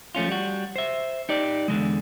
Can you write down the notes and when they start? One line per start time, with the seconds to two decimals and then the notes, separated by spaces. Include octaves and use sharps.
0.15 F3 A3 C#4 F4
0.28 G3 F#4
0.76 C5 E5
1.29 D#4 G4 D5
1.68 E2 D3 E3 G#3